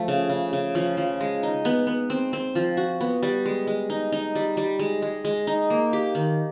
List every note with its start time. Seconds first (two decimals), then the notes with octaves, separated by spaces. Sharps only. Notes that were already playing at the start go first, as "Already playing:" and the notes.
Already playing: F3 A3
0.08 C#3
0.30 C#3
0.53 C#3
0.75 F3
0.97 F3
1.21 G#3
1.43 D#4
1.65 B3
1.87 B3
2.10 C4
2.33 C4
2.55 F3
2.77 F#4
3.01 B3
3.23 G3
3.46 G#3
3.67 G#3
3.90 D#4
4.12 D#4
4.35 G3
4.57 G3
4.79 G#3
5.02 G#3
5.25 G#3
5.47 D#4
5.70 A#3
5.93 G4
6.15 D#3